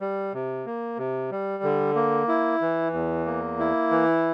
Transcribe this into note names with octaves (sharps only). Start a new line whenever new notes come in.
G3
C3
A#3
C3
G3
D3
A#3
E4
E3
E2
A#3
E4
E3